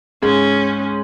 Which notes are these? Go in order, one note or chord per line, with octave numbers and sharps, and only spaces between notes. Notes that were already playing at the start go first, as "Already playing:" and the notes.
G#2 G#3 C#4